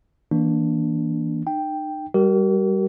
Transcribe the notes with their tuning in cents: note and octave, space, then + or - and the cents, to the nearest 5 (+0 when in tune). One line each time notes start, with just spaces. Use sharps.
E3 -20 A#3 +15 D4 +0
D#4 -40 G5 +0
G3 +0 G4 -45 A#4 +0